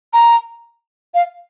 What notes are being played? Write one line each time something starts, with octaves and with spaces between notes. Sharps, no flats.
A#5
F5